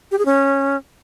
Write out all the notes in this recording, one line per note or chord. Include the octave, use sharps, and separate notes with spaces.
G4
G#4
C#4